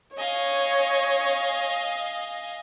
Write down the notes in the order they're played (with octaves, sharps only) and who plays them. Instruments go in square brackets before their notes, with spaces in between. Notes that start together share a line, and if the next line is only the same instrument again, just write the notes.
[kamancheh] C#5 [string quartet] D#5 F5 G#5